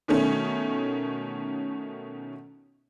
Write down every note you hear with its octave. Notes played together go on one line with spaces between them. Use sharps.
B2 D#3 A3 C#4